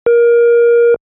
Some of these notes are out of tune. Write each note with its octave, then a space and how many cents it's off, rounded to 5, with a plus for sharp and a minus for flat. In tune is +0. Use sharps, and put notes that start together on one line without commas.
A#4 +20